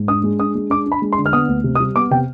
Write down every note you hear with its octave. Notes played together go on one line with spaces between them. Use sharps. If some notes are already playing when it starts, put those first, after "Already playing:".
Already playing: G#2
D4 D#6
G#3
D4 D#6
G#3
D4 D6
D4
B5
G#3
C6
D3
F6
B3 D#6
D2
C3
D#6
G3
B3 D6
C3 G5